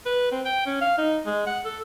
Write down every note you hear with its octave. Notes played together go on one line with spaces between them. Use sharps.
B4
C4
G5
C#4
F5
D#4
G#3
F#5
A4